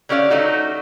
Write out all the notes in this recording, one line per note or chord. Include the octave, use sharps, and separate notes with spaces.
D3 C#4 G4 D5 F5
F#3 A3 D#4 F#4